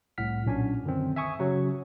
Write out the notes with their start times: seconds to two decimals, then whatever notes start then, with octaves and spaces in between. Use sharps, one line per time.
0.18 C2 A2 F#5 F6 B6
0.45 B1 A#2 C#4 D4 G#5
0.84 F#2 D3 D#3 C4
1.16 E5 G#5 C#6 D#6
1.39 C#3 F#3 C#4 F#4 C#5